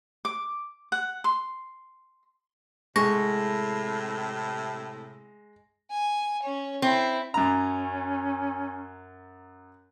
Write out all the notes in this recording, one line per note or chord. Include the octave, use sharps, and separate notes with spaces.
D6
F#5
C6
A2 C3 G#3 C#6 A#6
G#5
C#4 C#5
C4 E4
F#2 C#4 A#5